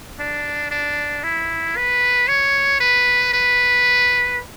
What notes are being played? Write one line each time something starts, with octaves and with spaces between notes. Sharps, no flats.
D4
D4
E4
B4
C#5
B4
B4